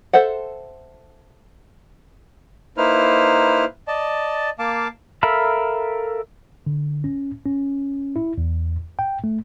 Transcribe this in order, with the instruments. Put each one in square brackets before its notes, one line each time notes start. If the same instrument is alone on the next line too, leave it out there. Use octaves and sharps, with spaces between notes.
[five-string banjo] A4 C5 E5 F#5
[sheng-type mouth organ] A#3 D#4 E4 B4 C5 F6
D5 D#5 A5
A#3 F5 A5 D6
[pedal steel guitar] A4 A#4 E5 F5 B5
[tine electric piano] D3
C#4
C#4
E4
E2
G5
A3